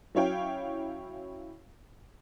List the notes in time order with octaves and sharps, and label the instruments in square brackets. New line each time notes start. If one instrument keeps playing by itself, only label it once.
[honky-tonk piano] F#3 C#4 E4 C#5 F5 G5